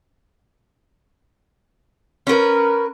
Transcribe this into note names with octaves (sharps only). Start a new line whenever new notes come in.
C#4 D4 A#4 B4